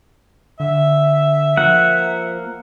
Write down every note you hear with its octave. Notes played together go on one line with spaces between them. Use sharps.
D3 E5
F3 A#3 F#5